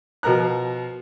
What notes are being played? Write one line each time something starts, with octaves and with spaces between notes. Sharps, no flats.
B2 F3 A#4 A#5 F#6